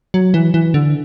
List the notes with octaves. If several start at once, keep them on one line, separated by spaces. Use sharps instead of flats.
F#3
E3
E3
D3